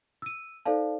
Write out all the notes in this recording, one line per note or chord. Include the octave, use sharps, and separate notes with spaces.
E6 D#7
D#4 A4 C5 D5 F5 A5